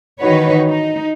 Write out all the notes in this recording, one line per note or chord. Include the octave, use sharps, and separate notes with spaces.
D#3 E3 D#4 F#4 B4 C#5
D#4